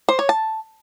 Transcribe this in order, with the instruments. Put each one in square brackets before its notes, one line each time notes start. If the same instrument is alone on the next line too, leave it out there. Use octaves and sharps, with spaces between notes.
[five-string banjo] C5
C#5
A5